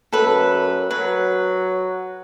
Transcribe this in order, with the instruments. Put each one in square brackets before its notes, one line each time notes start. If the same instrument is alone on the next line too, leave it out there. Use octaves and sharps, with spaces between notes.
[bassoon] F#2 [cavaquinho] A4 B4
[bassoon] F#3 [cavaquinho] B4